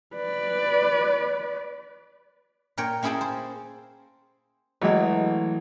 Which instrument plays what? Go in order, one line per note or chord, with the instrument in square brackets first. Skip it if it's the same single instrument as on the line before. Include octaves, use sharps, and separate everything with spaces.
[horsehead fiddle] B4 D5
[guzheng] A#2 A#4 C#5 G5
A#3 C#4 E4 G#4 G5 A5
C5
[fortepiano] G#1 G#3 [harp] E3 F#3 A3